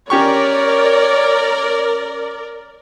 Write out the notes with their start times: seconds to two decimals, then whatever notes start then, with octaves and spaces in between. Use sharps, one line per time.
0.10 C#4 G4 A#4 C#5 D5 C#6